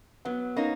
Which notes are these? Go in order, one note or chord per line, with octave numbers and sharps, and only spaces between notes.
F#3 B3
A#3 C#4 D#4